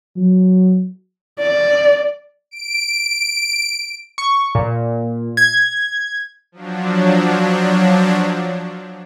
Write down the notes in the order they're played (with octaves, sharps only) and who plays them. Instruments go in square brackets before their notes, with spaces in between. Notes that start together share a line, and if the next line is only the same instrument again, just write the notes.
[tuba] F#3
[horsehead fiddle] D5
[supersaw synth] D7
[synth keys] C#6
A#2
G#6
[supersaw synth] F3 F#3 D4